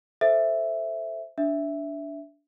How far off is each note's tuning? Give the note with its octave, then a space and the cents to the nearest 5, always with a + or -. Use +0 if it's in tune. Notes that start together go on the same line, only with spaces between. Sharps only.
A4 +0 C5 +0 E5 +0
D4 -15 E5 +0